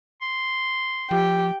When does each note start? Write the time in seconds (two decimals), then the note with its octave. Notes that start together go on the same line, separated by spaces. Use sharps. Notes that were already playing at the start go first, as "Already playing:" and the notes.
0.21 C6
1.11 F3 G4 G5